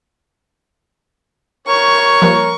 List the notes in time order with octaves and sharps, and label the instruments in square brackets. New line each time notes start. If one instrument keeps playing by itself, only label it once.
[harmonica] A#4 C#5 [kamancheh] C#6
[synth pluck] F3 G3 A#3